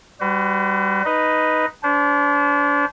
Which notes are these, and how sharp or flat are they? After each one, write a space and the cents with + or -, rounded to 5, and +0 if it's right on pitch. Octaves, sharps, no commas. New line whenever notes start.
G3 +0 F#4 +25 B4 +45
D#4 +0 B4 +0 D#5 +0
D4 -35 C5 -20